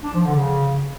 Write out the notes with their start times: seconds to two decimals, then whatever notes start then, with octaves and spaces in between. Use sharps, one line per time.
0.03 D4
0.14 F3
0.24 D3
0.35 C#3